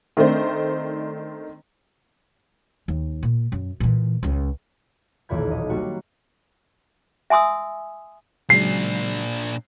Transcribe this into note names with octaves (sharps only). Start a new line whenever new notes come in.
D#3 A3 C4 D4 C5
D#2
A#2
F#2
A#2 E3
C#2 C#3
D#1 B1 E2 B5 G#6
D#5
G3 A#3 D4 F#4
E5 G#5 C6 D#6 E6
A#2 C#3 F#3 G#3 D4 C7